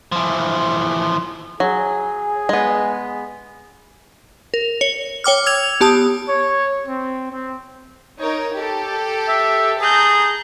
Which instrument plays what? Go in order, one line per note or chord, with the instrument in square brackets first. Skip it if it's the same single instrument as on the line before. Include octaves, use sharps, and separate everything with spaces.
[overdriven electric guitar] E3 F3
[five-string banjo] F#3 [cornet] G#4
[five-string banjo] G#3 B3
[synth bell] A#4
C#5
C#5 G5 D6 F6
E6 G#6 F7
B3 G4 A5 D#6
[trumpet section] C#5
C4
C4
[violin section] D#4 A#4 C#5
G4 A4
[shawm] E5
[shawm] G#4 [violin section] A5 A#5 G6